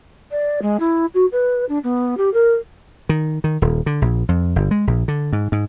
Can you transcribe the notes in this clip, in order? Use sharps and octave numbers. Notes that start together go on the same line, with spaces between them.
D5
G#3
E4
F#4
B4
D4
B3
G4
A#4
D#3
D#3
D#1
D3
A#1
F2
G1
G#3
A#1
D3
G#2
G#2